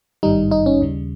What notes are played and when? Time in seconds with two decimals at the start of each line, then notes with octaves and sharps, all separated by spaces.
0.23 G#1 G2 D#3 G3 D#4
0.51 D#4
0.66 C#4
0.80 D#2 C#3 G3